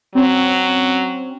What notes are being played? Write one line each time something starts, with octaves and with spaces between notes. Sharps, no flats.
F#3 C4 C#4